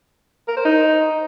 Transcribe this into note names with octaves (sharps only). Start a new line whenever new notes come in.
A#4
C5
D#4